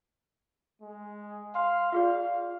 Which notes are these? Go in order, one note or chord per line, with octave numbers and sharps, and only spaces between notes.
G#3
F5 C6
F4 G#4 D5 F5